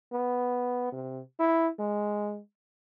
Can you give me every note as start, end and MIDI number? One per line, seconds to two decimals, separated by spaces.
0.12 0.92 59
0.92 1.21 48
1.39 1.68 64
1.79 2.40 56